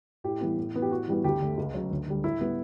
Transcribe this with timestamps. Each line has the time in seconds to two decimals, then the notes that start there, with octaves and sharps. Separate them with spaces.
0.24 A2 G4
0.41 E3 G3 B3
0.58 A2
0.74 E3 B3
0.82 G4
0.91 A2 F#4
1.08 E3 G3 B3
1.24 D2 G4
1.40 D3 A3
1.57 C#2
1.74 C#3 F#3
1.91 D2
2.08 D3 G3
2.24 A2 E4
2.41 G3 B3